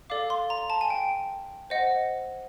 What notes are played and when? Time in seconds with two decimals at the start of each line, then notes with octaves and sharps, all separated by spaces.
0.10 A4 D5 F5 D6
0.30 C6
0.50 A#5
0.70 A5
0.81 G#5
0.90 G5
1.70 C5 D#5 F#5